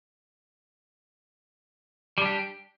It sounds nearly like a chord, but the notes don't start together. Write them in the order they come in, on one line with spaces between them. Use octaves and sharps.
G3 D4 G4